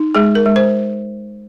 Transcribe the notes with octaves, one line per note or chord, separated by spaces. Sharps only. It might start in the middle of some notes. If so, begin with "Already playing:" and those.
Already playing: D#4
G#3 G#4
A#4
G#3
C5